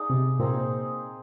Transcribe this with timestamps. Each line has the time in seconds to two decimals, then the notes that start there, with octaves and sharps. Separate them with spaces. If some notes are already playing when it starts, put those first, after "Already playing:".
Already playing: D#4 G#4 D5 F5
0.10 C3
0.39 A#2 C4 D#4 G#4